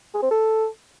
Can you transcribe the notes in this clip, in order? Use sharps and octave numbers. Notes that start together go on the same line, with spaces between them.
G#4
C4
A4